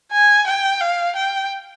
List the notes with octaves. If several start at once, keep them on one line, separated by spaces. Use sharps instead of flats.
G#5
G5
F5
G5